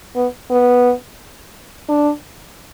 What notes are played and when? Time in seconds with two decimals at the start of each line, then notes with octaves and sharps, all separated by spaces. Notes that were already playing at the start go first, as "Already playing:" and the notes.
0.16 B3
0.51 B3
1.89 D4